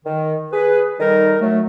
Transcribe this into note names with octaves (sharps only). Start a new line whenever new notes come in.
D#3
G#4 B4
D#3 G3 D#4 A4 A#4
F#3 A3